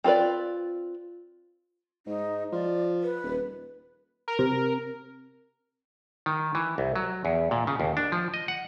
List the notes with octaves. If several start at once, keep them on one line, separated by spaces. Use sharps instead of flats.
C4 F4 A4 B4 D5
G#2 D#4
F3 D5
B4
D#1
A#4
C3
D#3
E3
C2
F#3
E2
A#2
C#3
D#2
D4
F3
D#5
F#5